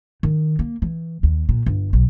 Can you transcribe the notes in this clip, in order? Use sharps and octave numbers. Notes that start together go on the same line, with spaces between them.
D#3
A#3
E3
D#2
A#2
G1
B1